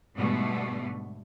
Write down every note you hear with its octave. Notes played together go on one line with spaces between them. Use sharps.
G#2 B2 D3 G3 A3 B3